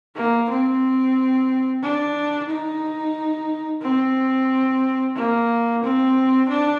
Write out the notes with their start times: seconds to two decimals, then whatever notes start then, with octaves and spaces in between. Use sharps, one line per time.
0.16 A#3
0.49 C4
1.82 D4
2.49 D#4
3.82 C4
5.16 A#3
5.83 C4
6.49 D4